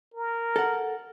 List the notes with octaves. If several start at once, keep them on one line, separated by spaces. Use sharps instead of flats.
A#4
A4 F#5